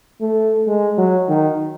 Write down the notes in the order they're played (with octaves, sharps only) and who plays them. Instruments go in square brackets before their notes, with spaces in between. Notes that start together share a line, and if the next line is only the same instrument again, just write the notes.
[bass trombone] A3
G#3
F#3
D#3